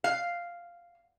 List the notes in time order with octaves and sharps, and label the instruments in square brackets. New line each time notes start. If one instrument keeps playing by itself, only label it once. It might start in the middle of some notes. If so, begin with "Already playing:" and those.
[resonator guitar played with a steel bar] F5